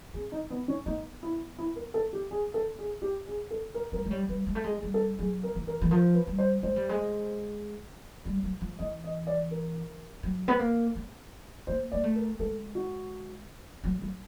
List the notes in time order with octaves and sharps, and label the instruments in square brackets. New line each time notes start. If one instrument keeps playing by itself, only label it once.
[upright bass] C4 [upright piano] G#4
[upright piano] D#4
B3
C#4
[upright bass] B3 [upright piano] D#4
[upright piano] E4
E4
A#4
A4
G4
G#4
A4
G#4
G4
G#4
A4
A#4
[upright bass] G3 [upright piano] A#4
[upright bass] G#3
[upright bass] G3 [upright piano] C#5
[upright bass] G3 [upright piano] B4
[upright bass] G#3
A3
G#3
[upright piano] G#4
[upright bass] G3
[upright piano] A4
[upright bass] F#3 [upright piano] G#4
[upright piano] A#4
[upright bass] E3
[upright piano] A#4
[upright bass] E3
[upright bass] F3 [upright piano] A#4
[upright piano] B4
[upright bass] G3
[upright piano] C5
[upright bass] G#3 [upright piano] C5
[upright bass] G3
G#3
G3
F#3
F3
[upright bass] E3 [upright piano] D#5
[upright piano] D#5
D5
A#4
[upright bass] F#3
B3
A#3
B3
[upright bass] A#3 [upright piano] C5
[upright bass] A#3 [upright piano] D5
[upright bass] A3
[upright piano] A#4
[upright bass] G#3 [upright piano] A4
[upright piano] F#4
[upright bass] F#3
F#3